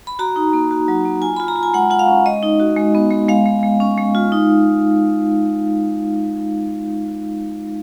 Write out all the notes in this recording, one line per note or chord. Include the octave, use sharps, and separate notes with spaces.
B5
F#4 A#5
D#4
A#3
F#4
F#3
A#3
F4 G#5
F4 B5
A#5
F4
G#5
G#3 F#5
F4 F#5
F5
C#4
G#3 D#5
D#4
F#4
G#3
B3
G#3
G#3 F5
G#3
G#3
C#4
G#3
F4
D#4